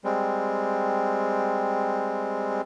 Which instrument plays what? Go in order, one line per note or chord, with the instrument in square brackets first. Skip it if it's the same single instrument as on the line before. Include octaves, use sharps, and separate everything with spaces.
[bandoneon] G3 G#3 C4